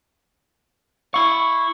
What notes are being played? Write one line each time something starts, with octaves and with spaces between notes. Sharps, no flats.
E4 F5 C#6